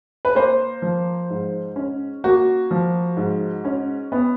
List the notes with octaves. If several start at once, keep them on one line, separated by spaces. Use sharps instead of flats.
B4
A#3 C5
F3
G#2
C#4
A#3 F#4
F3
G#2
C#4
B3